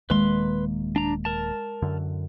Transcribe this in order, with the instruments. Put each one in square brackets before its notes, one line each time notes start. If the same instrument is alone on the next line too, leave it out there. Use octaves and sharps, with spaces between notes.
[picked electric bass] D#1 D#3 A#3 [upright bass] G#3 [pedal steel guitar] B4 C6
[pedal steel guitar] D4 A#5
A#4 A5
[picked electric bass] F#2 D3